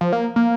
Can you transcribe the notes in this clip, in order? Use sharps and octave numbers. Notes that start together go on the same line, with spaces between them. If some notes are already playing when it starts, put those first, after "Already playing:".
F3
A#3
A#3